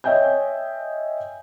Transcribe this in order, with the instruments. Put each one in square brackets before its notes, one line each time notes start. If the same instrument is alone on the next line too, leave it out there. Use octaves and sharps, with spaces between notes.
[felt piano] C#5 D#5 E5 G5 G#5 G6